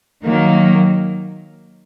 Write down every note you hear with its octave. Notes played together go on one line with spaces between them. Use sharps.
D#3 F#3 A#3